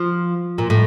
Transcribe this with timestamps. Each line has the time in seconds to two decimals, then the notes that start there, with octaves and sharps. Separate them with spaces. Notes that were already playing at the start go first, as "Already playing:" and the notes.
Already playing: F3
0.58 A#2
0.70 A2